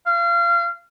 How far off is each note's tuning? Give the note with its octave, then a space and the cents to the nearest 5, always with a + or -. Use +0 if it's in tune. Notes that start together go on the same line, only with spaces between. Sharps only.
F5 -30